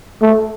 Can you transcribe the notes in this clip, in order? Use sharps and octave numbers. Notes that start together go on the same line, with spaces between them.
A3